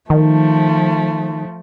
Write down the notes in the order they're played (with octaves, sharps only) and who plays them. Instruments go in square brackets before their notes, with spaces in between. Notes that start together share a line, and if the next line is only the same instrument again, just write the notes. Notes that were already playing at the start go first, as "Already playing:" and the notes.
[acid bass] D#3 [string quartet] F3 A3